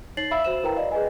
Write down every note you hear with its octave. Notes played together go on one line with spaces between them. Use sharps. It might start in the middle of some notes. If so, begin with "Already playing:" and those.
D#4 C#5 A6 C7 F#7
E5 F5 B5 E6
F#4 C5 E7
E4 A#4 B4 G5 A#5
D5 D#5 F5
G#4 B4 D#5 G#5